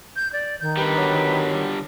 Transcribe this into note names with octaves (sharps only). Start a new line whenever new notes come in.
G6
D5
D#3 G6
D3 G3 B4
F#3